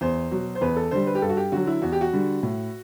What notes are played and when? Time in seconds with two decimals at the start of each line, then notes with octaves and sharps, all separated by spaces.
0.01 E2 C5
0.31 B2 F#3
0.55 C5
0.61 E2 B4
0.76 A4
0.91 D3 G3 C5
1.07 B4
1.15 G4
1.22 G2 A4
1.29 F#4
1.37 G4
1.52 D3 F#3 F#4
1.67 E4
1.82 E2 F#4
1.92 G4
2.01 F#4
2.13 D3 G3
2.43 A2